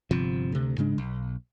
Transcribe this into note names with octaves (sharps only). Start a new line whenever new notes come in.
G1 C3 F3
D2 C3
G#2 C#3 G#3 D4
B1